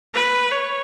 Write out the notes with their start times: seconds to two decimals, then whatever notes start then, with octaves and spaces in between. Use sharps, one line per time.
0.15 B4
0.51 C#5